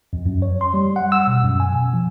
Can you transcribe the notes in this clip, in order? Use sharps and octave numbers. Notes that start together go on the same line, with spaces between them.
F2
F#2
C#5
C6
G3
F#5
E6
B2
F#2
G#5
B2
F3